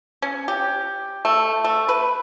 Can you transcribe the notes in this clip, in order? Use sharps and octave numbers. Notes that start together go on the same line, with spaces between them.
C#4
G4
A3
A3
B4